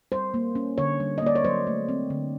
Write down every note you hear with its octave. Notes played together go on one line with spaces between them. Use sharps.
G3 C5
A#3
C#4
D3 C#5
G3
D#5
A#3 D5
C#5
F#3 C5
A3
C4
D3